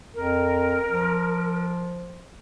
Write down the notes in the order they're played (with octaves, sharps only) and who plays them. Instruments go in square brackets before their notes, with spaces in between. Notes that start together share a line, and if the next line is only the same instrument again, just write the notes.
[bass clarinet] F2 [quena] A#4
[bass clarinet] F3